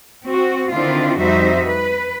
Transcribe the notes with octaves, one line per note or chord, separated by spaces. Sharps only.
C4 F#4
D3 D#3 C4 D4 E4 F4
F2 G3 D#4 F#4 C5 E5
B4